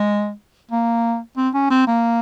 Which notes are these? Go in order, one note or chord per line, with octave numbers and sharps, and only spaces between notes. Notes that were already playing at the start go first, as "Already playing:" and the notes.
Already playing: G#3
A#3
C4
C#4
C4
A#3